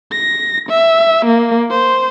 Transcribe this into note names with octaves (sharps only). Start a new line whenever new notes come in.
A#6
E5
A#3
C5